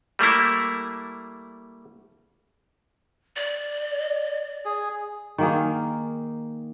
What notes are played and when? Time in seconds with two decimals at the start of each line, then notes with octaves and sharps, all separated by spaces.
0.19 G3 A3 A#3 E4
3.36 D5
4.65 G#4
5.38 D#3 A#3 G#4